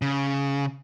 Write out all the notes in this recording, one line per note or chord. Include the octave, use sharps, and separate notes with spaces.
C#3